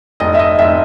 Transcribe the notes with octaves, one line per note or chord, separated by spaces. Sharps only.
F1 D#5
E5
D#5
F1 E5